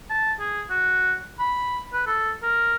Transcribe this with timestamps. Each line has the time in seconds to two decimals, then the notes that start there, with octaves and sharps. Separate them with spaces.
0.10 A5
0.40 G#4
0.70 F#4
1.39 B5
1.93 B4
2.07 A4
2.43 A#4